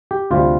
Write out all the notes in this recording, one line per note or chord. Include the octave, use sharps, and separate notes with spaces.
G4
D2 C3 G3 F4